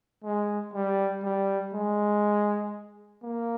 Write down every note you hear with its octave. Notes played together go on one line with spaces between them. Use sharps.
G#3
G3
G3
G#3
A#3